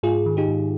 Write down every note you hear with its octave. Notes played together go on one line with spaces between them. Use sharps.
G#2 F4 G#4
D#3
D#4 G4
G#2